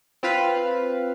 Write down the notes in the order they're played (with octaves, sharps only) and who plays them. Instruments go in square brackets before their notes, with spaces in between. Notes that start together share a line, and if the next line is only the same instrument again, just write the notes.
[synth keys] C4 F4 B4 F5